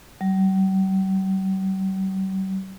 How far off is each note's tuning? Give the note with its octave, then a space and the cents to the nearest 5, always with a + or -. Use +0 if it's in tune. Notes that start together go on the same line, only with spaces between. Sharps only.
G3 -45